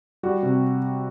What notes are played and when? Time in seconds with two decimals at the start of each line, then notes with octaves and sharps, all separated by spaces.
0.23 G3 F#4
0.43 C3